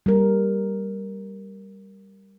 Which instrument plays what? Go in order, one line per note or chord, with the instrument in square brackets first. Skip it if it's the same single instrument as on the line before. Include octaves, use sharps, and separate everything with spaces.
[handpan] G3 A#4